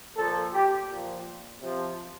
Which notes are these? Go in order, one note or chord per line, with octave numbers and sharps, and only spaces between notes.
A#2 F3 A4
G4
A#2 F3
C3 F3